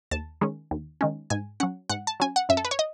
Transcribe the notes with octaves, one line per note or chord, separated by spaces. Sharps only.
D#2 A5
D#3 G#3 C#4
D#2
D#3 G#3 C#4
G#2 G#5
F#3 C#4 F#5
G#2 F#5
A5
F#3 C#4 G#5
F#5
F#2 E5
A4
B4
C#5
D#5